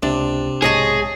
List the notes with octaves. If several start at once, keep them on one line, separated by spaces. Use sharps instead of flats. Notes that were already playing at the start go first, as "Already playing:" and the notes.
C#2 C3 D4
B1 G#2 G#4 C#5 D#5 A5